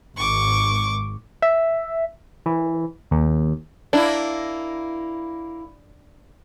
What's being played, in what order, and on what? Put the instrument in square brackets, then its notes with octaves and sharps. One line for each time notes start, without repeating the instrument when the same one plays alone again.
[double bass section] G#1 [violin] C#6 D6
[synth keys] E5
E3
D#2
[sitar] A#3 E4 [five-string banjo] D4